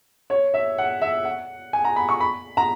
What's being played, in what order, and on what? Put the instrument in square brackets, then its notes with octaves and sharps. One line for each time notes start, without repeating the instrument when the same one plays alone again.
[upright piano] C#5
E5
F#5
E5
F#5
G#5
A#5
B5
C#6
B5
A#5